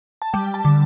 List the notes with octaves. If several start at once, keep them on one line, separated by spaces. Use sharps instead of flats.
A5
G3 G5
A5
D3